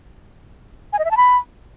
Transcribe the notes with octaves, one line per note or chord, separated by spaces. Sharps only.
G#5
D#5
E5
A5
B5